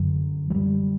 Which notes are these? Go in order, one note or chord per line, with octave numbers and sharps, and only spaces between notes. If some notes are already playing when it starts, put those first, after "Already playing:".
Already playing: F#2 D3 F#3
F#3
G3